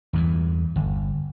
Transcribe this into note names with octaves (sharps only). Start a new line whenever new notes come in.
E2 G2 E3
G1